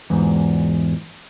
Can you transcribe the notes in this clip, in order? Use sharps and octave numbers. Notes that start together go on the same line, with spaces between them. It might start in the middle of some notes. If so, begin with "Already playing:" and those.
E2 G#2